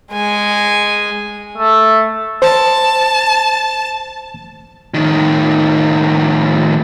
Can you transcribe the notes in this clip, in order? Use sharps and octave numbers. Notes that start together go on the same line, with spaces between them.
G#3 G#5
A3
C5 A5
A2 D#3